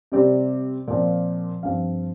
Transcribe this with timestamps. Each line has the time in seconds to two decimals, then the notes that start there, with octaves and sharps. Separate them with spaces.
0.12 C3 G3 C4 D5
0.88 A#2 F3 C4 D5
1.63 G2 F3 C4 F5